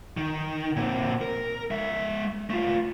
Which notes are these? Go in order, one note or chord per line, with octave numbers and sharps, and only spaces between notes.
D#3
A#2 C4
A#4
G#3 E5
A3 F4